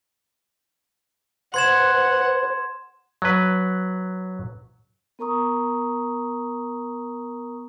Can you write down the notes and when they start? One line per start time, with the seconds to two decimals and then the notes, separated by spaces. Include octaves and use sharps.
1.54 B4 C5 F#5 C6 G#6 E7
3.22 F#3 B4
5.19 B3 A#4 A#5 C#6 D#6